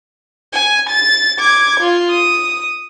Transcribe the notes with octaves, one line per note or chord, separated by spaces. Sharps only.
G#5
A6
D6 G#6
F4
D#6